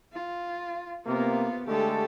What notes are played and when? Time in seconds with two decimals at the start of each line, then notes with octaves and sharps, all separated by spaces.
0.13 F4
1.06 C3 A#3 B3 F4
1.67 D3 G#3 A3 G4 A4